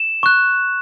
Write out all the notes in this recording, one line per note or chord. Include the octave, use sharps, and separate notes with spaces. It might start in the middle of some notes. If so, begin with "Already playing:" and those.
Already playing: E7
C#6 F#6